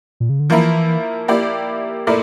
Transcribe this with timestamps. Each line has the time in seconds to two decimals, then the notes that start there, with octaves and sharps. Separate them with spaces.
0.20 A#2
0.30 C#3
0.40 D3
0.50 E3 F3 A#3 E4 A#4
1.28 A#3 E4 G4 D5
2.07 A#2 A3 E4 A#4 D5